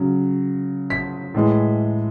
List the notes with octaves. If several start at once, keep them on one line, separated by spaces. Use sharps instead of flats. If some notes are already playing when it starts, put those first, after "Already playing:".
Already playing: C#3 F#3
B6
A2 E3 G#3